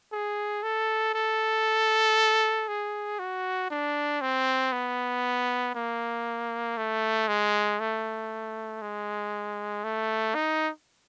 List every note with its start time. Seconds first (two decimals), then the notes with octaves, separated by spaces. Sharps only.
0.12 G#4
0.63 A4
1.14 A4
2.68 G#4
3.19 F#4
3.70 D4
4.21 C4
4.72 B3
5.75 A#3
6.77 A3
7.28 G#3
7.79 A3
8.82 G#3
9.84 A3
10.35 D#4